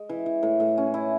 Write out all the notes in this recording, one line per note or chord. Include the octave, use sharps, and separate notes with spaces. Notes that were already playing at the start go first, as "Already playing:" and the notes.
Already playing: G#3
E3
E3
A2
A2
C#4
E4